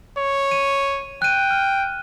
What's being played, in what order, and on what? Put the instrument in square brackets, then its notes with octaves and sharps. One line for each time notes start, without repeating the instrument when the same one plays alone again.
[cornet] C#5
[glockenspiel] D#7
[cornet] G5 [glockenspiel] F#6 D#7
[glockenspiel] F6